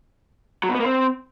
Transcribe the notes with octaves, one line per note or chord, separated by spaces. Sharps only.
F#3
B2
B3
A#3
C4